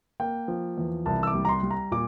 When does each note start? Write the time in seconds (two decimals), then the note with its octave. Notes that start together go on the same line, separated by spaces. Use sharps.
0.20 A#3 G5
0.48 F3
0.78 E2
1.06 C2 A5
1.23 E6
1.27 D6
1.34 G3
1.45 A#5
1.49 C6
1.63 G3
1.71 A#5
1.91 A#2 D6